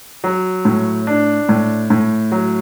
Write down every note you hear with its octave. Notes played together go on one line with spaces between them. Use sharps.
F#3
A2
D4
A2
A2
F#3